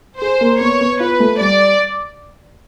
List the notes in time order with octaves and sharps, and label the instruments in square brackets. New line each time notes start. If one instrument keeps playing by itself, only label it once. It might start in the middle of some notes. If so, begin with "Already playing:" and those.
[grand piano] G#4 [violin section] C5
[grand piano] A#3
[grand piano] B3 [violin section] C#5
[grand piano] B3
[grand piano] F4 [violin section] B4
[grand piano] A3
[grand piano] G3 [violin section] D5